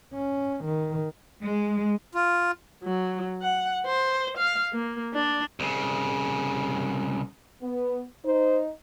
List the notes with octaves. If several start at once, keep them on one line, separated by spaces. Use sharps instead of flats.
C#4
D#3
G#3
F4
F#3
F#5
C5
F5
A#3
D4
C2 C#3
B3
D#4 C5